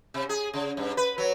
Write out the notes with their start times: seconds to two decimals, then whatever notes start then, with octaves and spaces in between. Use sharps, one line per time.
0.14 C3
0.29 G#4
0.54 C#3
0.77 G2
0.97 B4
1.18 F#3